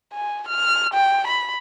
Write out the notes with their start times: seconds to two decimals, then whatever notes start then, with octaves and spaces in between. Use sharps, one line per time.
0.13 G#5
0.48 F6
0.94 G5
1.27 B5